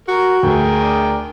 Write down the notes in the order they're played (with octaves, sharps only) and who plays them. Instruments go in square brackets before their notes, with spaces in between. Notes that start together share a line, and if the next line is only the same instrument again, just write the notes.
[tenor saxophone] F#4 [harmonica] A#4
[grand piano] D2 A3 [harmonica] G#4 A#4 G5
[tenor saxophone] D4